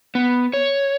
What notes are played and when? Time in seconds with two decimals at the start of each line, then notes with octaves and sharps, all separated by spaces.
0.15 B3
0.53 C#5